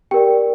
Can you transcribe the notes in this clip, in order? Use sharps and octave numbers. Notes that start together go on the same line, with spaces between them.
G4 A#4 D5 G5